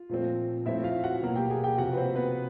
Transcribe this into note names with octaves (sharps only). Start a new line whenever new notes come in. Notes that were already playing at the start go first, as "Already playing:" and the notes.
Already playing: F4
A#2 F3 A3 C4
A2 F3 A3 C4 E4 E5
F4 F5
F#4 F#5
B2 F#3 A#3
G4 G5
G#4 G#5
G4 G5
C3 F3 A#3 F#4 F#5
B4
C4 C5
B3 B4